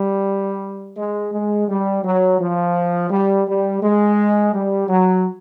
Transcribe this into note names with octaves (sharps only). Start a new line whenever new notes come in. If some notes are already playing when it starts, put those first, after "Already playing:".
Already playing: G3
G#3
G#3
G3
F#3
F3
G3
G3
G#3
G3
F#3